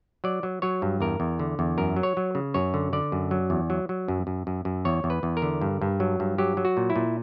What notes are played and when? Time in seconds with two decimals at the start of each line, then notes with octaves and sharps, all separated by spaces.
0.24 F#3 D5
0.43 F#3
0.62 F#3 C#5
0.82 G2
1.00 E2 A#4
1.20 E2
1.39 D3
1.59 E2
1.78 F#2 A#4
1.96 F#3
2.03 C#5
2.17 F#3
2.35 C#3
2.54 F#2 C#5
2.74 D3
2.93 D3 D5
3.12 F#2
3.31 F#3
3.50 E2
3.70 F#3
3.89 F#3
4.08 F#2
4.27 F#2
4.47 F#2
4.65 F#2
4.85 E2 C#5
5.04 E2
5.10 B4
5.23 E2
5.37 A#4
5.42 D3
5.61 G2
5.81 G2
6.00 F#3
6.20 G2
6.38 F#3 G4
6.57 F#3
6.65 F#4
6.77 A#2
6.90 E4
6.96 A#2